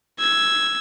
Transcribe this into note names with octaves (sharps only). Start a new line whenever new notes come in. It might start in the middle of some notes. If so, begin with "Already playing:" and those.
E6 G#6